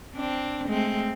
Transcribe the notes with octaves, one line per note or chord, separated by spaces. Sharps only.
C4 D4
G#3 A3 C4